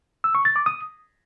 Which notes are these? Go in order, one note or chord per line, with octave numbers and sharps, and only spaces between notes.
E6
C#6
A6
D6
D#6